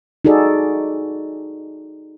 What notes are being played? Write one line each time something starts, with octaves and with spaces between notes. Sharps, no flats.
D#4 F#4 G#4 A4 D5